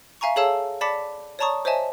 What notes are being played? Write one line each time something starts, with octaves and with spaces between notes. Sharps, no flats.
E5 F5 G#5 A#5 C#6
G#4 A4 C#5 F5 A5 E6
D5 A5 B5 D6 B6 C#7
C#5 D5 A5 A#5 C#6 D#6
C5 C#5 D#5 E5 G#5 A5